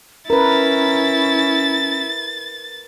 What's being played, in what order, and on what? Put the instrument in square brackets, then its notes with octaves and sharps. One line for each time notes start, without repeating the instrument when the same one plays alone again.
[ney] C#4 [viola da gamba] E4 [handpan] A#4 B4 [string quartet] A6